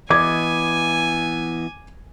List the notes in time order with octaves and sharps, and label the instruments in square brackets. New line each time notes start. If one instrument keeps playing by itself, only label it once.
[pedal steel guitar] E3 B3 D#5 [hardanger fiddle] G#5 [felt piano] D6 G#6